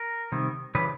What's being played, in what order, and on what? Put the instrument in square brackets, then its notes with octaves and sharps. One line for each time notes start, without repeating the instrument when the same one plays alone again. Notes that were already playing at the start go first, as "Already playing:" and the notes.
Already playing: [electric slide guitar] A#4
C3 D#3 G3
C#3 E3 G3 B4